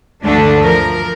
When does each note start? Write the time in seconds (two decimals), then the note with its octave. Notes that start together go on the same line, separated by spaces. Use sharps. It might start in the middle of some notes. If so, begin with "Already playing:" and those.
0.23 D2 G2 D3 A3 D4
0.61 F3 A#4